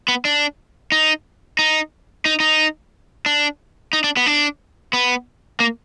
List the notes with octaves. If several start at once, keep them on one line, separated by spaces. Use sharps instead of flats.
B3
D4
D#4
D#4
D#4
D#4
D4
D#4
D4
B3
D4
B3
A#3